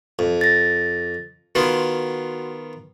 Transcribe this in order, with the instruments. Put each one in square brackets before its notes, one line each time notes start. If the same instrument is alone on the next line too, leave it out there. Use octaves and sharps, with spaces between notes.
[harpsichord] F2
[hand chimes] A6 A#6
[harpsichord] D#3 B3 F4 [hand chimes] F#4